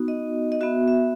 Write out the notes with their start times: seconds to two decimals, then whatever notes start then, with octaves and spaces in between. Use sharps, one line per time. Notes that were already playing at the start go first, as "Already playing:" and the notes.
Already playing: B3 D#4 F#4
0.08 D#5
0.52 D#5
0.61 B3 F#4 E5
0.88 E5